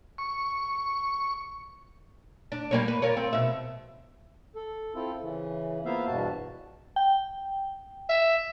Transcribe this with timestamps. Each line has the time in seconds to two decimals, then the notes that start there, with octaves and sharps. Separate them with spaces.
0.18 C#6
2.52 D4
2.71 G3 A#3 C#5
2.88 B4
3.02 F4 A#4 C#5
3.17 C4
3.33 B2 E5
4.56 A4
4.95 C4 E4 F4 A4
5.22 C#3 E3
5.85 A#3 B3 F4 C5 E5 F5
6.07 E2 G2 B2 F#4 A5
6.96 G5
8.09 E5